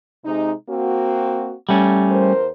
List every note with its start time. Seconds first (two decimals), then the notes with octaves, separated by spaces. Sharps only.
0.25 C3 G#3 D#4
0.69 A#3 C4 F#4
1.69 G3 A3 C#4
2.09 E2 A#4 C5